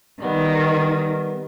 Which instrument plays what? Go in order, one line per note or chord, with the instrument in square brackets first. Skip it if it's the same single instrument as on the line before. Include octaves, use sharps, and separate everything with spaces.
[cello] D#3 [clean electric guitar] G3 B3